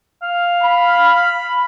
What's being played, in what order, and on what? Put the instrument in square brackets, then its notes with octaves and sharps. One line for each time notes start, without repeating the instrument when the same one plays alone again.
[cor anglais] F5
[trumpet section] B5